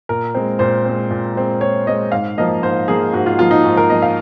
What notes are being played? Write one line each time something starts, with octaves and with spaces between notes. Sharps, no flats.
A#2 A#4
G#3 C4
A#2 C5
G#3 C4
A#2
G#3 C4
A#2 C#5
G#3 C4 D#5
G#2 F5
F3 A#3 D#5
G#2 C5
F3 A#3 G#4
G#2 F#4
F4
F3 A#3 F4
D#4
G#2
A#4
F3 A#3 D#5
F5